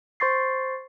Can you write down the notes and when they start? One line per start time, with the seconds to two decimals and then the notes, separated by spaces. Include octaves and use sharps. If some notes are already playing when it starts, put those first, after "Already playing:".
0.20 C5 C6 C#6 A6 C7